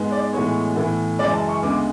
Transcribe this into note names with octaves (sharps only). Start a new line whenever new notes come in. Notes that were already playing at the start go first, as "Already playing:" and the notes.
Already playing: G#2 G#3 B3
D5
A2 E3 G#3 B3 C#5
A2 E3 B3
F#2 C#3 E3 G#3 D5
A5
C#6
D2 C#3 G#3 B3 D6